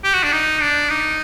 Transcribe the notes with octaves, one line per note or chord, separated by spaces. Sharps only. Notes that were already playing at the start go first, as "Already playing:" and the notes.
G4
F#4
D4
D#4
D4
D#4